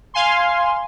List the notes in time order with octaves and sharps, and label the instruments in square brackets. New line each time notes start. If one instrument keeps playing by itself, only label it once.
[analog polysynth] F5 G#5 C6